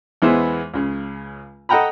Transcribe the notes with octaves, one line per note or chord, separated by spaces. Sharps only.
E2 E3 G#3 B3 C5
C#2 C#3
A4 D#5 F#5 G5 A#5 B5